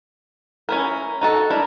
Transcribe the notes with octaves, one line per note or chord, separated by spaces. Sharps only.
C#4 E4 A#4
D#4 F#4 A4
D4 E4 A#4